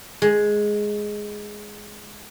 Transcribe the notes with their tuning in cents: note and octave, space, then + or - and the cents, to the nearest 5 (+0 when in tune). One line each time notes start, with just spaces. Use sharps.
G#3 +5